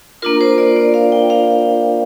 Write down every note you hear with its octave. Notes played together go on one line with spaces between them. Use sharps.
A#3 D4 F4 A#4
C5
D5
D5
F5
G5
F5